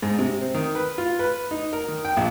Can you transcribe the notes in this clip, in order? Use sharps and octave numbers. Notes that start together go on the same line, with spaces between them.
G#2
C3
C4
D#3
B4
F4
B4
D#4
A#4
D#3
G5
A#1